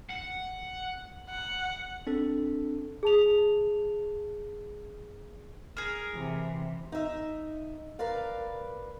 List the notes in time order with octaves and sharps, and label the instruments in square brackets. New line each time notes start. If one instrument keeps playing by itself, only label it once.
[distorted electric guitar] F#5
[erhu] F#5
[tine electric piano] C4 D4 A4
[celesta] G#4 A5 F7
[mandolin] G#4 A#4
[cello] C3 E3
[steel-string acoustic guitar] D#4 E5
A#4 B4 D5 F5